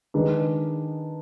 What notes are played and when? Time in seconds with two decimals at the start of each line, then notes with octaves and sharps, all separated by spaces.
0.14 D#3 G#3 D4 G#4 B4